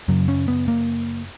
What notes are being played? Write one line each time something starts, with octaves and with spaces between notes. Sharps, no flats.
F#2 C#3 F#3
C#4
B3
A#3